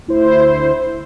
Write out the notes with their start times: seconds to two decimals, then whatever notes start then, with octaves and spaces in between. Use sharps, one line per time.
0.07 D2 E4 C5